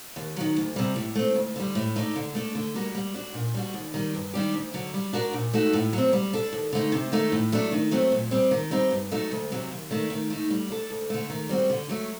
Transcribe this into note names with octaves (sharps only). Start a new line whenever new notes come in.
D#2
D#3 F#3
D2
C3 G3
A2
A3 C4
D2
D3 G3
A2
A3 D#4 A4 D5
D3
A3 D4 A4
D3
G3 A#3 F#4
G3
D4 F#4
A#2
G3 D4 F#4
D#2
D#3 G3
G2
D#3 G3 D4 G4
D2
D3 F#3
G3
D4 F#4 A#4 D5
A#2
A3 D#4 F#4 A4
A2
F#3 C4
G3
D4 A4
D#2
D3 A3 D#4
C3
D#3 A3 D#4
A2
F#3 A3 D4
D#3
F#3 A3 C4
A#2
G3 C4 G4
D#3
G3 C4 D#4
G2
F#3 A3 D#4 A4
D2
C3 F#3
D#2
D#3 A3 D4
D#3
A3 D#4
G3
D4 A4
D2
D3 A3
D#3
G3 C4 F#4
D3
F#3 A3